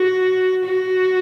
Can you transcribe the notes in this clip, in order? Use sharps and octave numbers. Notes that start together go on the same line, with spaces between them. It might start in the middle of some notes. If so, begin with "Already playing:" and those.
Already playing: F#4
F#4